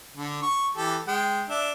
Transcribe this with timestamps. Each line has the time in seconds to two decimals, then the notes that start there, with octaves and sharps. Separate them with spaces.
0.16 D3
0.42 C#6
0.77 E3 G4 A4
1.08 G#3 G5
1.49 D4 E5